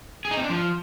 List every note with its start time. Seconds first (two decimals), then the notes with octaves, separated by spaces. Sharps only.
0.25 G#4
0.31 D#4
0.37 C4
0.43 D4
0.50 F3